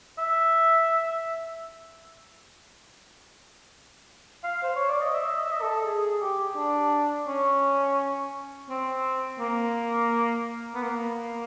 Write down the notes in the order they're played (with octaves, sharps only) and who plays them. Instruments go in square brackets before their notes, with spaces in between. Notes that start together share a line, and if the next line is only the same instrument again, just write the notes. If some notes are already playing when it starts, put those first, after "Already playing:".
[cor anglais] E5
F5
C5
C#5
D5
D#5
E5
D#5
E5
D#5
A4
G#4
G4
D4
C#4
C4
A#3
B3
A#3